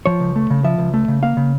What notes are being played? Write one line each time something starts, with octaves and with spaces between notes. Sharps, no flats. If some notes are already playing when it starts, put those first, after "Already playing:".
F3 C#5
C#2
A3
C#3
F3 E5
C#2
A3
C#3
A#3 F5
C#3